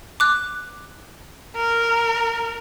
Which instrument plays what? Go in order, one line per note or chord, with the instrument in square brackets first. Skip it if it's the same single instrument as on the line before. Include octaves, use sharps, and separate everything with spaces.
[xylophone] D6 F#6
[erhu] A#4